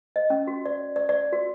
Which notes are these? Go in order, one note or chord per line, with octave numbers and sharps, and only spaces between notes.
D#5
C#4
F#4
D5
D5
D5
F#4